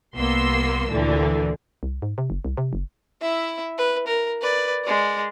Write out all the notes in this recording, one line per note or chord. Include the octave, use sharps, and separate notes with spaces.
C2 A#3 B3 C6 E6
D2 A#2 D3 E3
C2
G#2
C3
F#1
C2
C3
F#1
E4 E5
B4
A#4
B4 D5
G#3 D5